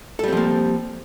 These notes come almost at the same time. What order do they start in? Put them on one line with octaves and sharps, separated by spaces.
A4 G3 C4 F3 A#3